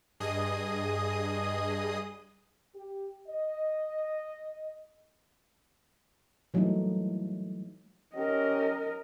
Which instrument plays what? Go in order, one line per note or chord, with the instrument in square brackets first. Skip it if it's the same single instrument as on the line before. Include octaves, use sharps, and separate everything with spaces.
[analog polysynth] G2 G#4 D#5 D#6
[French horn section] G4
D#5
[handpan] E3 F#3 G3 A3 A#3 D#4
[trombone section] C#4 G4 [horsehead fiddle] A#4 D#5